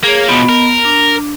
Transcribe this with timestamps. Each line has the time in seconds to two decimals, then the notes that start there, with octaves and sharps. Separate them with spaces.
0.04 A#3 G#4 C#5
0.28 B2 F3 B3 D#5
0.49 A#4
0.85 D4